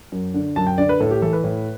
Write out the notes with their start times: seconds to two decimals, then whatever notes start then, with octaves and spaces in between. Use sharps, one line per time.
0.12 F#2
0.34 D3
0.56 F#2 A5
0.67 G5
0.78 D3 D5
0.89 B4
1.00 A2 A4
1.11 G4
1.22 E3 A4
1.33 B4
1.44 A2